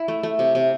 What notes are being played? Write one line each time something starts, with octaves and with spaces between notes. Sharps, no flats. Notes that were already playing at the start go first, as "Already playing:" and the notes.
Already playing: E4
A3
A3
C3
C3